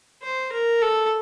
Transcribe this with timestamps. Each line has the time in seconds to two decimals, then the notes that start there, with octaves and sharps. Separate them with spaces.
0.22 C5
0.52 A#4
0.82 A4